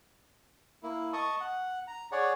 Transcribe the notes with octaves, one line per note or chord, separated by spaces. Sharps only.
A#3 E4
D#5 A5 C#6 D#6
F#5
A#5
G#4 C#5 D5 F#5